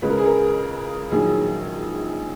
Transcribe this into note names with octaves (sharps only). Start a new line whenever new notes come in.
C#2 C#3 G#3 B4
A#4
G#4
A#4
A#1 D#3 F#3 G#4